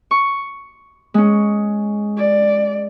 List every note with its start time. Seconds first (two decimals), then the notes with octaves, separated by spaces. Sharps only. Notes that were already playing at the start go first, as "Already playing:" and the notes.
0.11 C#6
1.14 G#3 C#4
2.17 D5